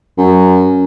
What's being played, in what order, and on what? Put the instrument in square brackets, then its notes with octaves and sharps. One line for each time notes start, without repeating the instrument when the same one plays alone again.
[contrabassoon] F#2